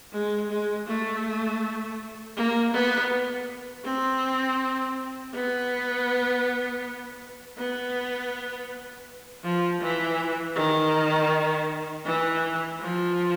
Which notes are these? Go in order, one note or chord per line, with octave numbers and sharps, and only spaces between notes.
G#3
G#3
A3
A#3
B3
C4
B3
B3
F3
E3
D#3
E3
F3